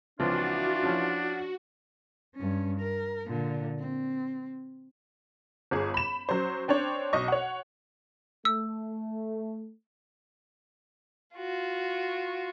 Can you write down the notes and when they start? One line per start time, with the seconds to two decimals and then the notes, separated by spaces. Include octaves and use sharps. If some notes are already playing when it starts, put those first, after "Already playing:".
0.20 C#2 E3 F3 C4 D4 F4 F#4
0.81 F3 C#4 E4
2.35 G2 C#4
2.80 A#4
3.27 A#2 D3
3.79 C4
5.71 G1 G#4
5.94 B5 E7
6.29 F#3 C#4 C5
6.68 C4 D4 C5 C#5
7.13 B1 D#5 C#6
7.28 C#5 F#5
8.45 A3 E6
11.37 F4 F#4